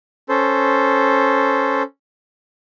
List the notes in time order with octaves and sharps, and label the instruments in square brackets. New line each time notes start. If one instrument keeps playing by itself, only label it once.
[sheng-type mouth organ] C#4 A4 C5